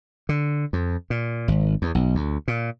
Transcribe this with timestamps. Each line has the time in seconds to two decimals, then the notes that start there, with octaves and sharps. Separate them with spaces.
0.29 D3
0.73 F2
1.10 A#2
1.48 G#1
1.82 E2
1.95 B1
2.15 D2
2.48 A#2